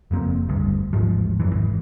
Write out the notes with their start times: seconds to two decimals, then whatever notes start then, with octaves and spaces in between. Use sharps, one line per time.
0.11 F#1 F2 A#3 C4
0.49 G1 D2 G2
0.93 A1 D#2 G#2 F3
1.40 E1 F#2 E3
1.53 G#1